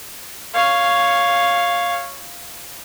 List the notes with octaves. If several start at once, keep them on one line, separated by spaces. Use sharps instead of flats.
C#5 F5